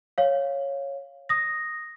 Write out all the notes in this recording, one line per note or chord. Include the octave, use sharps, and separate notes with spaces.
C#5 F5
D#6 A#6